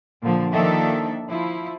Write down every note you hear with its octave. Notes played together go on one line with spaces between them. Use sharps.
A#2 D3 F3
D#3 F3 A#3 D4 A4 E5
F3 E4